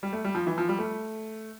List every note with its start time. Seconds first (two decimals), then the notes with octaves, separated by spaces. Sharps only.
0.03 G3
0.13 A3
0.24 G3
0.35 F3
0.47 E3
0.58 F3
0.69 G3
0.79 A3